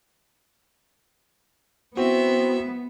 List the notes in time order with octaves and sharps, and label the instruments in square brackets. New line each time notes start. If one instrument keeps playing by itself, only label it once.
[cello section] B3 [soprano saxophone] C4 [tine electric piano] E4 F#4 [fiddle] E5